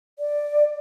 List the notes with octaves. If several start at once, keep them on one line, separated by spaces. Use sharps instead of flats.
D5